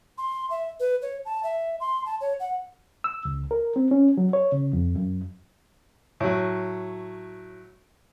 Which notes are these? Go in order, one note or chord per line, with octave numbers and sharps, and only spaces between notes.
C6
E5
B4
C#5
A5
E5
C6
A5
C#5
F#5
E6
C#2
A#4
C4
C#4
F#3
C#5
C#3
F2
F#2
A2 F#3